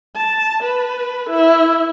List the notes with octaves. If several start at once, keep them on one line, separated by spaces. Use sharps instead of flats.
A5
B4
E4